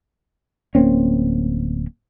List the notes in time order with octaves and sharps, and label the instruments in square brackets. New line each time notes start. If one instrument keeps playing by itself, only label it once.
[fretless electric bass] D1 A#3 C4 C#4